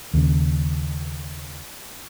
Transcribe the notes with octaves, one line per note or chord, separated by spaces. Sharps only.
D#2 C#3